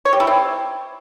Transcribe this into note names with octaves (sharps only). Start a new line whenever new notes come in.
C#5
G4
E4
C4